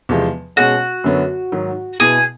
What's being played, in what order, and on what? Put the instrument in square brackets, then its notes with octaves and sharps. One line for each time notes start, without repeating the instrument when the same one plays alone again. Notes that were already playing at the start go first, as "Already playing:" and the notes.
[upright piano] E2 C3 F3 G#3
[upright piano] B2 G#3 C#4 [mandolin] F#4
[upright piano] F#2 D3 F#3 B3
G#2 D#3 F#3
[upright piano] B2 G#3 B3 E4 [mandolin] G#4